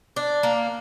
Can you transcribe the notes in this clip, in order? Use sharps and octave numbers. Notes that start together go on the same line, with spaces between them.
D4
A#3